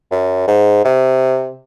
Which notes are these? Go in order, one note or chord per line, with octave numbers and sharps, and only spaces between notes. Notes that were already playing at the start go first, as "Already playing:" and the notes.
F#2
G#2
C3